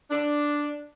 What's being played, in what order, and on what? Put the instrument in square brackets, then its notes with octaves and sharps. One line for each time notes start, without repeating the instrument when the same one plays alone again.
[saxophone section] D4